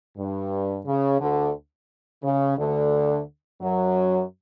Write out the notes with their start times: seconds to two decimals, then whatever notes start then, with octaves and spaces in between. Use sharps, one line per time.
0.17 G2
0.86 C#3
1.20 D2 D3
2.23 C#3
2.58 D2 D3
3.61 F#2 F#3